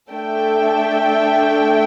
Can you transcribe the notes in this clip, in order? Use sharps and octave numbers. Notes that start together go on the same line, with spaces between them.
A3 D4 A4 E5 G5